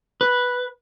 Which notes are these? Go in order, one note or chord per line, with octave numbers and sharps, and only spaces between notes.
B4